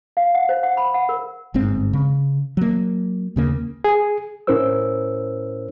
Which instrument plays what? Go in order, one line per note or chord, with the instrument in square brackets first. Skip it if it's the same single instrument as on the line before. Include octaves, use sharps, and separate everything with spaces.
[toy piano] F5
F#5
C5
F#5
B5
F#5
A#4
[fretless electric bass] G1 G#2 C4
C#3
F#3 A#3
D#2 C#3 A#3
[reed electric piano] G#4
A2 C#4 E4 A#4 C5 E6